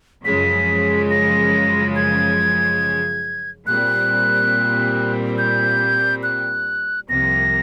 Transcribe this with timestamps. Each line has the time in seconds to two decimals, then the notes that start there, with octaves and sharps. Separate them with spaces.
0.24 F#2 C#3 F3 G#3 B6
1.10 A#6
1.96 G#6
3.66 A#2 G3 C4 F#6
5.38 G6
6.23 F#6
7.09 C2 C3 F3 A#3 A#6